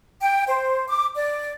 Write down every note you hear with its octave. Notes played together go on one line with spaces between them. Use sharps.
G5
C5
D6
D5